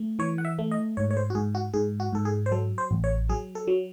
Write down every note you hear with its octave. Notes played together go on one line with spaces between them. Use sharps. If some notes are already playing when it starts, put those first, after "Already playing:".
Already playing: A3
E3 C#5
F#5
E5
A3
D#5
G#2 C#5
C#5
C5
F#4
G#2 G#4
F#4
G#2 G#4
F#4
G#2 A4
G#4
C5
F#3 A4
C5
A1
C#5
F#3 G#4
A4
F#3